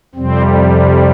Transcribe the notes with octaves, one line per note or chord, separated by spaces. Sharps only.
F2 C3 G3 C4